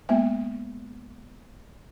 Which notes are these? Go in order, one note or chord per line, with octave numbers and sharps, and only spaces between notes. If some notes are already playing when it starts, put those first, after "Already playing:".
G#3 A#3 B3 E5